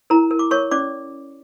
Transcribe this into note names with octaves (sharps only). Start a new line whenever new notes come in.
E4 A#4 A#5
A#4
D6
A#4 C#5 C#6
C#4 D5 D6